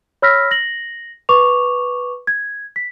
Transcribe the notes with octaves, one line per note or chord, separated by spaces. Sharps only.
C#5 B5 E6 F6 A#6 B6
A#6 F#7
B4 C#6 D6 F7
G#6
B6